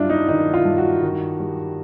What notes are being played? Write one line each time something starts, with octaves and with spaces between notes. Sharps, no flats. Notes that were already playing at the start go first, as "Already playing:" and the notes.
Already playing: G2 F#3 D4 E4 F4
D#4
D#3 D#4
F4
G2
F#4
D#3
G3